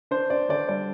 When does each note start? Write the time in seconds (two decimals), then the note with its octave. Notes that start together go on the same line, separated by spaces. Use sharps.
0.11 D4 C5
0.30 D4 D5
0.49 D3 D5
0.69 G3 D5